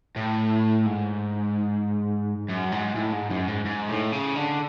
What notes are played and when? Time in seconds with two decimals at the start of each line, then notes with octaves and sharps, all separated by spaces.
0.16 A2
0.86 G#2
2.49 F#2
2.72 G#2
2.96 A2
3.13 G#2
3.30 F#2
3.48 G#2
3.65 G#2
3.88 A2
4.12 C#3
4.35 D3